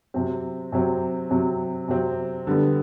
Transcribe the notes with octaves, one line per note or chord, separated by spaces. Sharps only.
C3 F#3 C4
C3 F#3 C4
C3 F#3 C4
C3 F#3 C4
D3 G3 B3